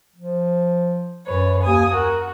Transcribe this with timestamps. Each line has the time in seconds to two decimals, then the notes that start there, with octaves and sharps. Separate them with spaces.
0.16 F3
1.26 F#2 B4 C#5
1.63 D#2 G#5 D#6
1.93 F#4 A#4